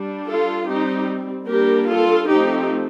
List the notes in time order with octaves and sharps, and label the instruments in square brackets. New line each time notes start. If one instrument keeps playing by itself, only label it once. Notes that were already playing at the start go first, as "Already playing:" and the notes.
Already playing: [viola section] G3 D4
F4 A4
G3 C4 D#4 G4
G3 A#3 D4 G4 A#4
F4 A4
F3 A3 C4 D#4 G4